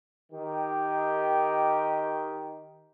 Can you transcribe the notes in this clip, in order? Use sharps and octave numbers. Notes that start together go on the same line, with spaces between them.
D#3 G4